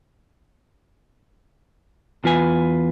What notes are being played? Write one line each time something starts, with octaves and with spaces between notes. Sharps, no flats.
E2 F4 B4 G#5